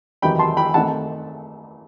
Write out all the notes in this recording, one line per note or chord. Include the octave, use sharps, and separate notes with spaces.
E2 C3 D#3 F#3 G5 B5
A5 C6
G5 B5
D#3 A3 C4 D#4 F#5 A5